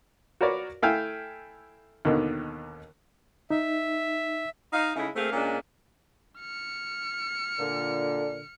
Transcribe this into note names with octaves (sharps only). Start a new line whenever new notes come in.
F#4 A#4 B4 C#5 D5
A3 E4 F5 G5 G#5
D#2 B2 D3 D#3
D#4 E5
D#4 F5
C#3 G#3 A3 D#4 E4
A3 A#3 C4 G#4 F5
A#2 G#3 A#3 C#4 D4
F6 C#7
A#2 D3